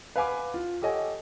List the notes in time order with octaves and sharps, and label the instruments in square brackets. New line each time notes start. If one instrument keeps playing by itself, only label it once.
[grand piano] B4 F5 F#5 G#5 B5 D6
F4
G4 A4 C#5 D#5 F#5 G#5